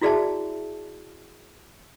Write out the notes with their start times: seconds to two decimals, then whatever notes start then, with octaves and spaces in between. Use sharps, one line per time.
0.02 E4 F#4 G#4 D5 E5 A5